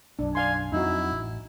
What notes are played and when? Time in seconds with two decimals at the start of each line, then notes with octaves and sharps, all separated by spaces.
0.19 B1 F#2 D4
0.35 D5 F5 G#5 C6
0.72 F2 F#3 C4 D#4 E4 F#4
1.11 A1